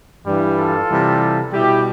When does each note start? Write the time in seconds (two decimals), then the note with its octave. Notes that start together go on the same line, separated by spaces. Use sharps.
0.24 G2 E3 G3
0.56 F4 A4
0.88 C3 E3 G3
1.53 B2 G3 E4 G4